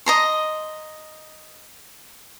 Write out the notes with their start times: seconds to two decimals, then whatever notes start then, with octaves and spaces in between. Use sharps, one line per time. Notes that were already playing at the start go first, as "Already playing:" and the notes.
0.06 D#5 A#5 C6